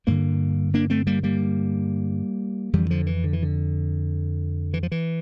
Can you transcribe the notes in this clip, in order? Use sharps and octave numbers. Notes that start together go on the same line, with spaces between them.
G2 D3 G3 A#3
A#3 D4
A3 C4
G3 A#3
G3 A#3
F2 D3 E3 G3
D3 F3
E3
D3
E3
D3
E3
F3
E3